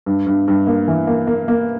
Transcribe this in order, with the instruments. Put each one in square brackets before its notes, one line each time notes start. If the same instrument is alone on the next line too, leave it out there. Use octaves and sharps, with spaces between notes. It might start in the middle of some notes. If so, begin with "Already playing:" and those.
[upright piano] G2
G2
G2
A#3
E3
A#3
A#3
A#3